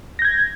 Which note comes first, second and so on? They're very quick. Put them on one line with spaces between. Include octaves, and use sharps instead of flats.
A#6 G6 G#6